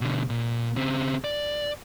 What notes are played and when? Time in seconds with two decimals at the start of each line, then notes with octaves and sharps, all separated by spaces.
0.01 B2 D3
0.30 A#2
0.76 C#3 C4
1.24 D5